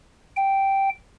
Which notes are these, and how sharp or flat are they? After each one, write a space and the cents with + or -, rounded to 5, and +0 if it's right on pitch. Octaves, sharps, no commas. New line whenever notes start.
G5 -5